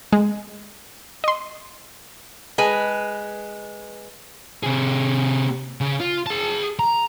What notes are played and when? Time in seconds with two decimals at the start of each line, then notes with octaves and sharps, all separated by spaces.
0.12 G#3
1.24 D#5 C6
2.58 G#3 B4 G#5
4.64 C3 G#4
5.81 C#3
6.00 F4
6.26 G#4 A5
6.79 A#5